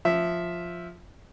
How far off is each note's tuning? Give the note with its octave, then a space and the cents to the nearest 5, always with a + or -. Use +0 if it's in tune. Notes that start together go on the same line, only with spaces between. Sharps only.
F3 +5 E5 +0